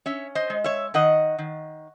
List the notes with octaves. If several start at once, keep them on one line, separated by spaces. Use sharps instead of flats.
C#4 C#5 E5
C5 D#5
G#3
C#5 E5
D#3 D#5 F#5
D#3